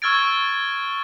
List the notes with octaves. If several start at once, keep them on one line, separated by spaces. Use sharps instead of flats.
C#6 E6 F6 G#6 A6 D7